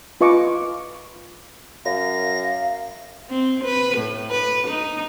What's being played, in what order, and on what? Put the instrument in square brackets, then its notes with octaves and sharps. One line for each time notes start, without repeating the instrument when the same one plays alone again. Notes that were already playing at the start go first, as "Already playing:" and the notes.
[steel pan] F4 B4 D#5 C#6 D6
[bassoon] F#2 [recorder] F5 [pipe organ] A#6
[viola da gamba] C4
B4
A2
B4
D#4